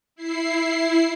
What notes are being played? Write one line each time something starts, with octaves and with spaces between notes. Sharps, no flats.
E4 C7